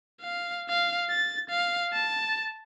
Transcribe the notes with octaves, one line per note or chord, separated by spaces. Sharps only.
F5
F5
A6
F5
A5